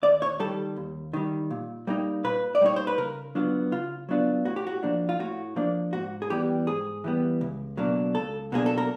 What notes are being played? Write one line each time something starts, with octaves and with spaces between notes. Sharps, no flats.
D#2 D5
C#5
D#3 G3 A4
D#2
D#3 G3
A#2
G3 A#3 D#4
A#2 B4
D5
G3 A#3 D#4 C#5
C5
B4
C#3 A#4
F#3 B3 D4 F4
C#3 F4
F#3 B3 D4 F4
A2 F#4
G4
F#4
F3 A#3 D4
F4
A2 F#4
F3 A#3 D4
G#2 F#4
G#4
E3 G3 B3 G4
G#2 G#4
E3 G3 B3
C#2
B2 F#3 A#3 D4
C#2 A4
B2 F#3 A#3 D4 G#4
A4
A#4